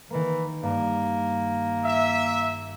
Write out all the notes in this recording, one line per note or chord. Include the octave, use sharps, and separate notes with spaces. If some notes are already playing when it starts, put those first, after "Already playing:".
D#3 E3 A#3
G2 A#3
E5